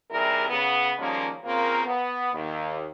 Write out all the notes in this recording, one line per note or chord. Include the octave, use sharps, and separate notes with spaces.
D#2 C3 G3 E4 G#4 A#4
C#3 B3
D#3 F3 G3 G#3 A#3 C#4
C#3 A#3 C4 F4 A#4
B3
D#2